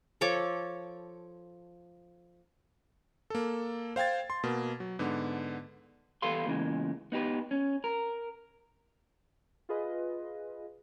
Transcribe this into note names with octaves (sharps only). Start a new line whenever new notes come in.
F3 A4 C#5 D6
A#3 A4
C5 F5 G5 G#6 A6
C6
B2 A#3
F#3
G#2 D3 B3
E2 G3 A4 B4 F5 C6
E2 A#2 C#3 E3 G#3
B3 D#4 G4 B4
C#4
A#4
F4 G#4 B4 D#5